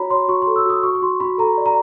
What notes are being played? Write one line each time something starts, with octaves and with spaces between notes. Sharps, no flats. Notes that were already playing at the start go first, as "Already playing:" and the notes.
Already playing: F#4 C#5 A#5 B5
C#5 C6
F#4 C#6
A4 C6
E6
F#4 D#6
F#4 C#6
C#6
F#4 C6
F#4 B5
A4 A#5
D5
A#5